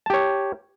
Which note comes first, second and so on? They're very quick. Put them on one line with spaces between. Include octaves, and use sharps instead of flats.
A5 G4 C#5